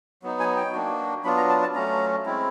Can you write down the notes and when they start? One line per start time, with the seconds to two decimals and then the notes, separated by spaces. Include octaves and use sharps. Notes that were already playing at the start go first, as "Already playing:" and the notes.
0.23 F#3 B3 D#4
0.40 G#5
0.57 G5
0.73 A#3 D4 F#4
1.24 F#3 B3 D4 F4 B5
1.37 A#5
1.49 A5
1.62 A5
1.75 F#3 A3 C#4 A#5
2.26 G#3 C4 E4